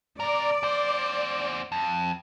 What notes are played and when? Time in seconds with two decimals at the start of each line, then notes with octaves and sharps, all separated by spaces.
0.20 C3 A#4 D5
0.63 E2 C5
1.72 F2